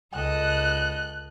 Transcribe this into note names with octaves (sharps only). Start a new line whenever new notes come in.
C#2 A4 D#5 F#6